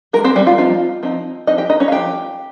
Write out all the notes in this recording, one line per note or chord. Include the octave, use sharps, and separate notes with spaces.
D#3 G#3 A#4
C4 C5
G3 G4
F4
F3 C4 D#4 F4
F3 C4 D#4
F3 C4 D#4 D#5
G4 G5
D#4 D#5
C#4 C#5
F5
F3 C4 D#4 G4 G5